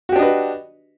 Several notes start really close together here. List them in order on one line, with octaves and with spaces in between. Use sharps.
F#4 G4 D4 D#5 B4